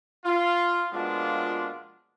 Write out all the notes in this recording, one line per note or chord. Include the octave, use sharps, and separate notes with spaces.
F4
B2 F3 G#3 A#3 D4 F4